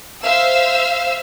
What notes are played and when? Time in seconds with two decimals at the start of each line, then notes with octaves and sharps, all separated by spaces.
0.24 C5 E5 F5 E6